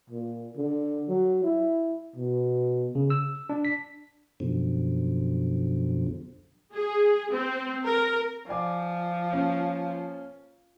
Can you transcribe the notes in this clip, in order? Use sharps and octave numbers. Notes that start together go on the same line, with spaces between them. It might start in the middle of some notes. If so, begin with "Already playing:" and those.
A#2
D3
F#3
E4
B2
C#3
E6
D4
B6
F#2 B2 D3 F3
G#4
C4
A#4
F3 D5 G#5 D6
A#3 C#4